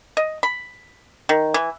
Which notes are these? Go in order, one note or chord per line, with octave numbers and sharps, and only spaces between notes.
D#5
B5
D#3
E3